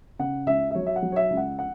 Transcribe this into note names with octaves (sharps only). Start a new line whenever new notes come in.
C#3 F#5
C#2 E5
E5
F#3 C#5
E5
F#5
F#3
C#5
E5
C#2
F#5
F#5